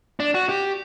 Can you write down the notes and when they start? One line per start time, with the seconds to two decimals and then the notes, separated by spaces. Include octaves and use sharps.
0.20 D4
0.34 F#4
0.49 G4